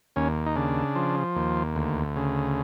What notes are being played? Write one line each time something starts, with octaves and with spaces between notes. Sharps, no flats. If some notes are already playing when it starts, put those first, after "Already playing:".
D#2 C#4
D#4
C#3 D4
F3
D#2
D2
C#3